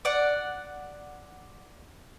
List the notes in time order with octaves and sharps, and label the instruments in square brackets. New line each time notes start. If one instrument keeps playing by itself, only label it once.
[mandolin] D5 F#5